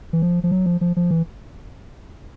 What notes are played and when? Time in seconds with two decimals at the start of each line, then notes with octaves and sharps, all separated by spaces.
0.13 E3
0.22 F3
0.44 F3
0.51 F#3
0.66 F3
0.81 F3
0.97 F3
1.11 E3